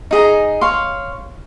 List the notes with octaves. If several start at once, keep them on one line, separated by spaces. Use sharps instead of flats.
D#4 G#4 D#5 A#5
C#5 F5 C6